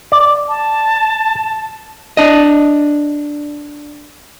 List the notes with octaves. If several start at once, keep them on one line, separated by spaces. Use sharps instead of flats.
D5
A5
D4 D#5